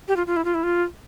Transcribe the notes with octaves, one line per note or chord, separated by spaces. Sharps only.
G4
F4
F4
E4
F4
E4
F4